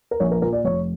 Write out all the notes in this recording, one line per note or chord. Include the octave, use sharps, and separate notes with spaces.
A#4
A#1 C#5
A#4
A#2 A#4
D5
F1 C#5